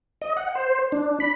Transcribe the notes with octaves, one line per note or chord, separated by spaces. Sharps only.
D#5
F#5
C5
D4
B5